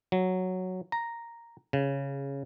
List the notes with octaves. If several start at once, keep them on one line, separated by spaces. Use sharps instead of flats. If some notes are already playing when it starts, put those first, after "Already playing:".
F#3
A#5
C#3